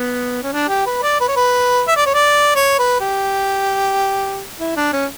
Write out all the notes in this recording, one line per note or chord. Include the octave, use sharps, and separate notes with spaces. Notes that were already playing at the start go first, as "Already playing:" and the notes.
Already playing: B3
C#4
D4
G4
B4
D5
B4
C#5
B4
E5
D5
C#5
D5
C#5
B4
G4
E4
D4
C#4